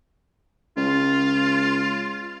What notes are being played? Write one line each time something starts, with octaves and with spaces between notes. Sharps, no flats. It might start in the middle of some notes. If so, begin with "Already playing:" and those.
C#2 F4